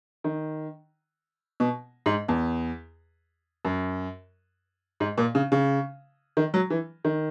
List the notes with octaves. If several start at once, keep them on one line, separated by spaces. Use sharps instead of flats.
D#3
B2
G#2
E2
F#2
G#2
A#2
C#3
C#3
D#3
F#3
E3
D#3